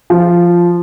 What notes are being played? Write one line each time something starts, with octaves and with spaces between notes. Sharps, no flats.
F3